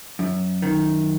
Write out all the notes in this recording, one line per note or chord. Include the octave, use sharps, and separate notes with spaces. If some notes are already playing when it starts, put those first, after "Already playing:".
F#2
D#3